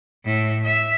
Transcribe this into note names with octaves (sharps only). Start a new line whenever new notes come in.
A2 E5
E5